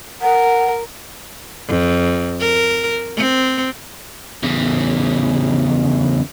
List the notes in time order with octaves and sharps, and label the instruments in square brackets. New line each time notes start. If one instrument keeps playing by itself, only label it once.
[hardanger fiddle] A#4 [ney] F#5
[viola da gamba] F2
A#4
C4
[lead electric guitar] E2 C#3